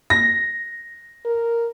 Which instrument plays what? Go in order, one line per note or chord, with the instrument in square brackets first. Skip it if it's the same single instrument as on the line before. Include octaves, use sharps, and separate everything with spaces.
[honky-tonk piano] A#6
[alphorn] A#4